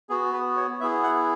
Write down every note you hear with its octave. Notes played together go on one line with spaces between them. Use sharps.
B3 F#4 G#4
B4
C#5
B3 E4 G#4 E5
F#5